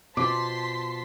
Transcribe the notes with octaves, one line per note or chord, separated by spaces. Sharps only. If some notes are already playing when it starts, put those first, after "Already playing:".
B2 F3 A5 C6 D6 B6